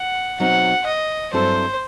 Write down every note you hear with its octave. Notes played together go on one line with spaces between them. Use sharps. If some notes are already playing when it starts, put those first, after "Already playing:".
Already playing: F#5
B2 F#3 C4 D#4 F#5
D#5
G2 F#3 C4 E4 A4 C5